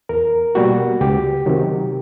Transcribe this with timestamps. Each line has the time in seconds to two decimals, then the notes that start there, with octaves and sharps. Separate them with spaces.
0.09 E2 A#4
0.55 B2 G3 A#3 F#4
1.01 C#2 G4
1.46 C3 D#3 F#3